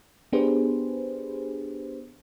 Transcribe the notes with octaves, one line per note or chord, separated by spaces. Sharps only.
B3 D4 G4 G#4 B4 C5